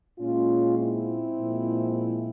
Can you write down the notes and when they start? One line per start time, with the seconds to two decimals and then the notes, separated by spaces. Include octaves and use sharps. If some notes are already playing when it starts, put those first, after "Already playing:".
0.18 A#2 G#3 C#4 F4
0.78 C4 E4
1.38 A#2 F3 G#3